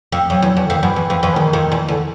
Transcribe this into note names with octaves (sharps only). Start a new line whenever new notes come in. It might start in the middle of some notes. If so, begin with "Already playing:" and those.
F2
F2 F#3
E2
E2
D3
F2
D#3
F#2 E3
E2
F2
F2
E3
E2 D#3
F2
E2
E2 D3